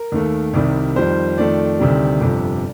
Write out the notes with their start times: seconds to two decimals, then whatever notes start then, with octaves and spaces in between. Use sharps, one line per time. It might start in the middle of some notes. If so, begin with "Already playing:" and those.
Already playing: A#4
0.12 D#2 D#3 A3
0.54 C2 C3 D#3 G3
0.96 F2 D#3 G3 C5
1.37 F2 D#3 A3 D5
1.80 D2 C3 D#3 G3
2.21 G1 F2 C3 G3